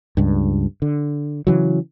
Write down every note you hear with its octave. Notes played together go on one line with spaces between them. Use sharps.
C#2 G2
D3
C#3 E3 F#3